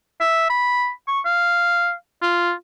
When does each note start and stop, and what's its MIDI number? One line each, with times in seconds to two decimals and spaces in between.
0.20 0.48 76
0.50 0.90 83
1.08 1.20 85
1.25 1.93 77
2.22 2.52 65